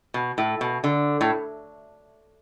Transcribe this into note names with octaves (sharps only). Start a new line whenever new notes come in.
B2
A2
B2
D3
A2